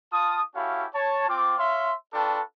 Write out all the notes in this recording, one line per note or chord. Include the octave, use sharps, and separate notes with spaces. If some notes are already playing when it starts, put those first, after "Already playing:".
F4 F5 A5 D#6
C#4 E4 F#4 G4 A4 F5
C#5 A5
C4 F4 D6
C#5 E5 F5 C6
D4 F4 A4 B4 G5 C#6